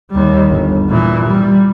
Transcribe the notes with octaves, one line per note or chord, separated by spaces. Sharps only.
D#2 G3
G1
A#2 E3
G3